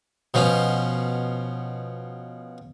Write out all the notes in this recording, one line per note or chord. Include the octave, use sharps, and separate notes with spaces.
B2 F3 C#4